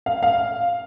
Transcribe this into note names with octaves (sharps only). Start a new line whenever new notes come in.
F5
F5